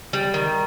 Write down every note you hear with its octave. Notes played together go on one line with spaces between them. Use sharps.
G3
D#3